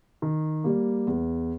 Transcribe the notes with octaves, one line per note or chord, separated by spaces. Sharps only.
D#3
G3 A#3
E2